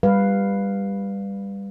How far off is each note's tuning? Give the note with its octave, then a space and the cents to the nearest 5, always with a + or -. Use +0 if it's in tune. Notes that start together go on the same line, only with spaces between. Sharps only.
G3 +20 B4 +0 F5 +0